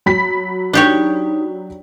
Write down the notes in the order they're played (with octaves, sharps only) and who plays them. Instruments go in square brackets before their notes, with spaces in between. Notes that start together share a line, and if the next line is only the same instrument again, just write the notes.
[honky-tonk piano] F#3 B5 B6
[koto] D4 G4 C#5 [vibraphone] D#4